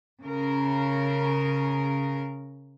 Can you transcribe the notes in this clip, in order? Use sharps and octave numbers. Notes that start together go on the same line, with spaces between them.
C#3 A#4